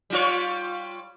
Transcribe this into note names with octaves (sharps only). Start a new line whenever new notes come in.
G3 F4 C#5